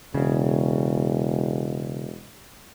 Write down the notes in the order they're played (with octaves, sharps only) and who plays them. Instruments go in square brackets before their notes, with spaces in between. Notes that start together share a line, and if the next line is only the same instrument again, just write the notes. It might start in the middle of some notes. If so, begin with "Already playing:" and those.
[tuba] E1 [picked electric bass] C#3